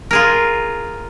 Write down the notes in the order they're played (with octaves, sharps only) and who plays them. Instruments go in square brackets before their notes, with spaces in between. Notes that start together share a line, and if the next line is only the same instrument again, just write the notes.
[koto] F4 G#4 A#4